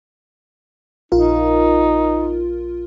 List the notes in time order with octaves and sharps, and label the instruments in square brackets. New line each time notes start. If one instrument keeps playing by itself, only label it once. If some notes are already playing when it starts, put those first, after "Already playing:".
[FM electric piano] A#1 F4 A#4 [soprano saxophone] D#4